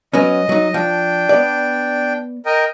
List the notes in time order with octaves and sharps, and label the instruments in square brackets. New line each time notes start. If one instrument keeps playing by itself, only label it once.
[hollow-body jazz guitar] F#3 B3 C#4 [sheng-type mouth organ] D#5
[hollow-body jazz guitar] F#3 D#4
[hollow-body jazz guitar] F3 [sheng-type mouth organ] D4 G5
[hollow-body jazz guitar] B3 D5
[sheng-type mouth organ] A#4 D#5 G5